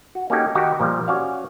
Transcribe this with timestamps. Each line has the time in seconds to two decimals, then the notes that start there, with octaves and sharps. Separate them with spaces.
0.15 F#4
0.30 A#3 C#4 D#4 F#4 G4 A4
0.55 D#3 D#4 F#4 G4
0.80 A#2 F3 G3
1.08 C#4 F#4 D5 F5